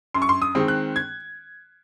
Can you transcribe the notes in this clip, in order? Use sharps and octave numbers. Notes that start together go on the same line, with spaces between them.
F#2 C6
C#6
C6
D#6
D#3 G#3 C4
F#6
G#6